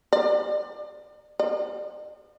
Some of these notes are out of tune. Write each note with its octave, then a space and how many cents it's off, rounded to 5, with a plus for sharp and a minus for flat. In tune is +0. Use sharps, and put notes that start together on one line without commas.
D5 +30
D5 +45